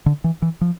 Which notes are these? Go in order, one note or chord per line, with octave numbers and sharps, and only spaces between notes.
D3
E3
E3
F3